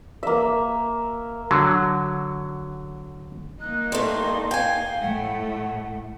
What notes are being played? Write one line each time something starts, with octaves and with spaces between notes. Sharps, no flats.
A#3 E5
D3 F#3
A#3 D#4 F#6
G3 A3 C6
F5 G5 G#5
A2 A3 F#5